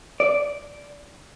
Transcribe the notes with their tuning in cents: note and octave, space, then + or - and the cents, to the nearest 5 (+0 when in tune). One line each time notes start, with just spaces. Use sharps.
D5 -10